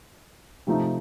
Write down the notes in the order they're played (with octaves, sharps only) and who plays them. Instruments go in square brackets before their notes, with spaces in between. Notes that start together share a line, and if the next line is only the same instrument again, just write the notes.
[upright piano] C3 F3 A3 D#4